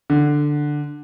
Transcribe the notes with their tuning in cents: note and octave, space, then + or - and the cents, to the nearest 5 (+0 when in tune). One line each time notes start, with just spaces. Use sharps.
D3 +5